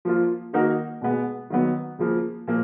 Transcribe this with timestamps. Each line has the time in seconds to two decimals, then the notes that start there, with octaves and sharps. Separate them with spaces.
0.05 F3 A#3 F4
0.53 D#3 A#3 D#4 F#4 A#4
1.02 B2 G#3 B3
1.50 D#3 F#3 B3
1.99 C#3 F3 A#3
2.47 A#2 F3 A#3